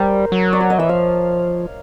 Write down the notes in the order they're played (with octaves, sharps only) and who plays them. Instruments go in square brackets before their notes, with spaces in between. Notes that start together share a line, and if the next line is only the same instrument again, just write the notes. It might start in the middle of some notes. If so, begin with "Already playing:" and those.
Already playing: [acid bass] G3 [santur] A#4 C5
[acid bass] F#3
[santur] D5
C#5
D#5
[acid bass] E3 [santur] E5
[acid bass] F3 [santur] F5